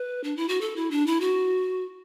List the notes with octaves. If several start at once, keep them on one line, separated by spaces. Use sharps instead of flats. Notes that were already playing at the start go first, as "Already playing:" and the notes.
Already playing: B4
D4
E4
F#4
A4
E4
D4
E4
F#4